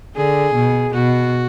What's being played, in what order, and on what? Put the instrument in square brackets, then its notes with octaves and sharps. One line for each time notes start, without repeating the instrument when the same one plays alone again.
[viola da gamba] D3 [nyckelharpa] G#4
[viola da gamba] B2
[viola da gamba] B2 [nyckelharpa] F#4